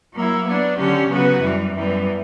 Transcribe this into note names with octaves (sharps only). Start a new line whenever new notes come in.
F#3 A#3 E4
F#3 B3 D4
D3 F#3 C#4 G4
C#3 F#3 B3 F#4 B4
F#2 E3 G3
F#2 E3 G3 B3